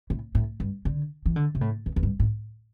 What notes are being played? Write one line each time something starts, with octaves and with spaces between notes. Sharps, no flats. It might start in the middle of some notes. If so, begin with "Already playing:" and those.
A2
A2
G2
D3
E3
D3
C3
A2
E2
E2
G2
A2